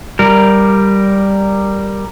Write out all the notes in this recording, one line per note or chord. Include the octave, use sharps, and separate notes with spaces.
G3 A#4